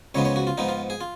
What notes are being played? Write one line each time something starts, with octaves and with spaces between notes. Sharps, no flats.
C#2 C#3 F3 G#3 B3 C#5
C#5
F#4
F4
G#2 F3 B3 D#4
F4
G#4
F4